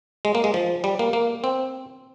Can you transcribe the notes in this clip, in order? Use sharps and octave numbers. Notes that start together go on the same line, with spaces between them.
G#3
A#3
G#3
F3
G3
A#3
A#3
C4